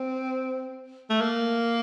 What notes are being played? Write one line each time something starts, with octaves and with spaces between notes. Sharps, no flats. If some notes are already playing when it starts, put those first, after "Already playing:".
Already playing: C4
A3
A#3